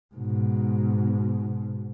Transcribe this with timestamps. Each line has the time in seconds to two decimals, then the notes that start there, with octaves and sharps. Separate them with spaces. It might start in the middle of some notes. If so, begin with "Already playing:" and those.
0.15 G#2 B2